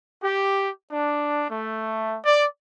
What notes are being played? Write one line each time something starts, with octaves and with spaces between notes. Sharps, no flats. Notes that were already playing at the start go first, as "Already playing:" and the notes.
G4
D4
A3
D5